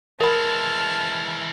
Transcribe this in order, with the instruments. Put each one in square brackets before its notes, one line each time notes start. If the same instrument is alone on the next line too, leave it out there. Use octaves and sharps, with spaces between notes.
[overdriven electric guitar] E3 G#3 [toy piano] A#4 B5 [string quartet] A5 F6